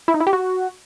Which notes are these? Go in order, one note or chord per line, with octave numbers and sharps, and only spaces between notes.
E4
D#4
E4
G4
F#4